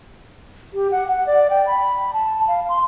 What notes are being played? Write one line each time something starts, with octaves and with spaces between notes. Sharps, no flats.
G4
F#5
F#5
D5
G5
B5
A5
F5
C6